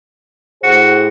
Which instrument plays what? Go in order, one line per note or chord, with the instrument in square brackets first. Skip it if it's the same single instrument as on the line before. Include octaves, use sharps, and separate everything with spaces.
[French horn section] A2 G#4 C5 [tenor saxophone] F#4